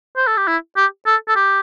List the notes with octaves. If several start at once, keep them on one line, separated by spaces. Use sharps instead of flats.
C5
A4
G4
E4
G4
A4
A4
G4